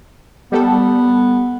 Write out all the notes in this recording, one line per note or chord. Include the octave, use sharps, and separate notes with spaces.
G3 B3 A4